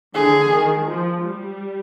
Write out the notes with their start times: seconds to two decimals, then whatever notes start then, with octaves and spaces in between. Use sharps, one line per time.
0.14 D3 G#4
0.50 D#3
0.87 F3
1.23 G3